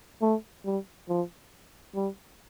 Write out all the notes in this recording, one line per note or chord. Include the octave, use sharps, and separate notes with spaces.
A3
G3
F3
G3